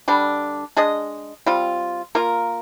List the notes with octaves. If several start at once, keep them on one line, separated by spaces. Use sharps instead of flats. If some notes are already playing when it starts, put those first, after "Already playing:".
D3 G3 D4
G#3 D4 G#4 D#5
G3 C4 F4
A#3 F4 A#4